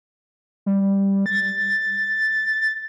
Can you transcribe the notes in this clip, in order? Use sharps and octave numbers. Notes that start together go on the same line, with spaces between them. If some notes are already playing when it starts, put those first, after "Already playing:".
G3
A6